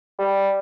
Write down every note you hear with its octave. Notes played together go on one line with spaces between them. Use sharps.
G3